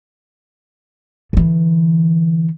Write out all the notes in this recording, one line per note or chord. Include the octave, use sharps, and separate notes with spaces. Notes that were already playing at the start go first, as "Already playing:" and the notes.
D3 E3